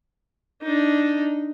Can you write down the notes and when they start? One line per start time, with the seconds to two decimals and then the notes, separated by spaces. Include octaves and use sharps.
0.63 D4 D#4